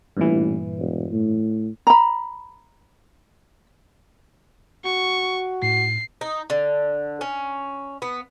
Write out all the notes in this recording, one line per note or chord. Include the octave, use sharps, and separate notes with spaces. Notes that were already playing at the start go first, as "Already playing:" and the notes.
A1 G2 A#2 E3
E1
A2
A#5 B5
F#4 C#6
A2 C7
D#4
D3
C#4
B3